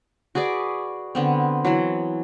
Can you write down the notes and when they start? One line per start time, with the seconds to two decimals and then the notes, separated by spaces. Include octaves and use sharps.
0.35 F#4 G#4 B4 D5
1.15 D3 B3 C4
1.65 E3 F#3